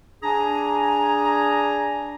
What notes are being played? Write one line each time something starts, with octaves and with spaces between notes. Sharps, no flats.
D4 G#4 G#5 A#5